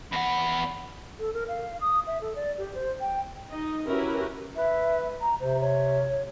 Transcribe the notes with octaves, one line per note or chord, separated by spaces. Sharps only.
E2 F#5 B5
A4
A#4
F5
D#6
E5
A4
D5
G4
C5
G5
D#4 D#5
C#4 E4 F#4 G4 A#4 B4
B4 E5
A#5
C3 C5
C#5